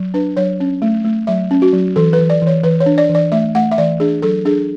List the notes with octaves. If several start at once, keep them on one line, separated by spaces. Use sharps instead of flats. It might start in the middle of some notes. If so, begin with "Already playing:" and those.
Already playing: F#3
D4 B4
F#3 C#5
C#4
A3
A3
F#3 E5
C#4
F#4
F#3
E3 A4
B4
E3
D5
E3
C#5
E3 B4
C#5
D4
D5
E3
D5
A3 E5
A3 F#5
E5
E3 D5
D4 G#4
F#3 A4
D4 G#4